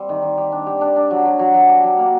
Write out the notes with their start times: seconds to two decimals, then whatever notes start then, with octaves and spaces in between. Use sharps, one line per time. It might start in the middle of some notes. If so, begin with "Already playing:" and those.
Already playing: G3 C4
0.09 D#3
0.22 D#3
0.38 G4
0.52 D4
0.67 G4
0.81 D4
0.96 D4
1.11 F#3
1.26 F#3
1.39 F#3
1.54 F#3
1.69 G4
1.84 F#3
1.99 A#3